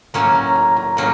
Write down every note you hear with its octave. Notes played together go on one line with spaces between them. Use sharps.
A2 F#3 A#3 C#4 A#5
A#5
A#5
A#5
A2 F#3 A#3 C#4 A#5